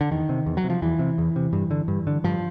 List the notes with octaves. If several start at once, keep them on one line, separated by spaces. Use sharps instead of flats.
D3
E2 D#3
C3
E2
F#3
C3
F3
E2 E3
C3
E2
C3
G2
D3
G2
D3
G2 F3